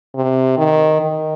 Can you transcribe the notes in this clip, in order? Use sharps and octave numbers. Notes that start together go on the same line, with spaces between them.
C3
D#3
D#3